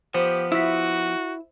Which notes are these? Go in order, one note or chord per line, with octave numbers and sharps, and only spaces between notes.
F3 B3 G4 C5
E4 F#4 E6 B6